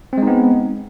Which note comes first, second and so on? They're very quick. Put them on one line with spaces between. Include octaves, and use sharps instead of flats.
C4 G#3 D#4 B3